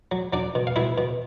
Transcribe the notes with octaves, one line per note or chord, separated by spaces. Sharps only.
F#3
F#3 D4 D5
B2
F5
B2 E4 E5
B2